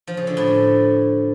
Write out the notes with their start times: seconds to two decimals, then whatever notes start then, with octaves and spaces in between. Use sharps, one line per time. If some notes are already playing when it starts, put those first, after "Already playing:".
0.07 F3
0.17 C#3
0.27 D3
0.37 A2